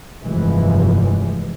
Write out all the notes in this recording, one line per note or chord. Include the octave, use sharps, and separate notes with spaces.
F1 G2 E3 F3 G#3